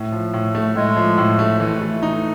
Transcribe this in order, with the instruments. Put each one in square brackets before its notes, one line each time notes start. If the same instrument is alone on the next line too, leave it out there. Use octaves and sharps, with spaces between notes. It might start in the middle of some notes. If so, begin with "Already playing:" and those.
Already playing: [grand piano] A2
F3
A2
A3
[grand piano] A2 [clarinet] G#3
[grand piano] F3
A2
A3
E3
A3
D#4